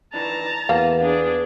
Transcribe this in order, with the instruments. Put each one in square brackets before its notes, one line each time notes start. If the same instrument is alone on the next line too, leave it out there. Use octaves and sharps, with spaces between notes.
[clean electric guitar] D#3 E3 D4 [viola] A5 A#5
[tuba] E2 [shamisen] A#3 [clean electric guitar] B3
[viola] D4 G#4